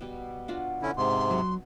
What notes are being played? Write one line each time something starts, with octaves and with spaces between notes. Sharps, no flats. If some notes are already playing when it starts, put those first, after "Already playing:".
B2 G3
D4 F4 F#4
D3 C#4 E4
G#2 C3 C6
F#3